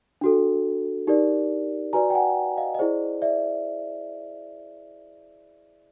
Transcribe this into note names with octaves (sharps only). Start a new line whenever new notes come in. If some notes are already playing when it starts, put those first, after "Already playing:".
D4 F#4 A4
D#4 G4 A#4 D5
F#4 B4 D5 G#5 A#5
G5
F#5 G#5
D#5 F5
D#5
E4 G#4 C5 D5
D5 E5